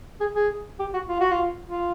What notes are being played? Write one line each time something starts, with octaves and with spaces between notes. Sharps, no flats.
G#4
G#4
G4
F#4
F4
F#4
F4
F4